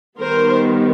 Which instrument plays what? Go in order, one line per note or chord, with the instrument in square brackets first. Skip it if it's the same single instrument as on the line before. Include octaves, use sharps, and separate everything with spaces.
[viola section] D#3 G3 B3 A#4 C5